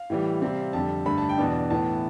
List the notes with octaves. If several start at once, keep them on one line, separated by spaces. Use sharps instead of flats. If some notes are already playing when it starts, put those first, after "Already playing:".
Already playing: F5
A2 E3 G3
C3 G3 C4
F2 D3 G3 A5
G2 D3 A3 B5
A5
G5
E2 B2 B3 D4 A5
A2 E3 B3 A5